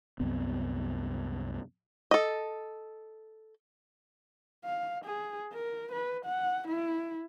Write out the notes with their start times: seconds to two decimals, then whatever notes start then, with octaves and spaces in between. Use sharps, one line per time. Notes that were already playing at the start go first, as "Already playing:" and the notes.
0.20 C2 F#2 B3 C4
2.11 A4 D#5
4.65 F5
5.05 G#4
5.54 A#4
5.92 B4
6.26 F#5
6.68 E4